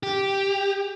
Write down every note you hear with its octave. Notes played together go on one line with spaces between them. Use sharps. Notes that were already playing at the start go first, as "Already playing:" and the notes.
G4